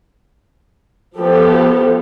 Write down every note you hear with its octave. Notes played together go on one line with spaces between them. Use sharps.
F3 B3 G4 A4